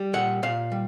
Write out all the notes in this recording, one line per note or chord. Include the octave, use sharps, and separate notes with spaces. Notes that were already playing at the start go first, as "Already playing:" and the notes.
Already playing: G3
A#2 F#5
A#2 F5
G3